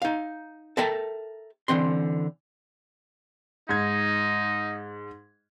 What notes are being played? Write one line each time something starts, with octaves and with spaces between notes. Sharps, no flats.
D#4 F5
A4 A#4 E5 G5 A5 A#5
D3 E3 C4 C6
G#2 D#4 G#6